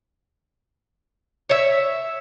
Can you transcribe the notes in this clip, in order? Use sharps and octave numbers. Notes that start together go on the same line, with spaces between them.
C#5 E5